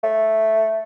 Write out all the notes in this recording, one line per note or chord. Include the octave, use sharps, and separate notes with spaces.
A3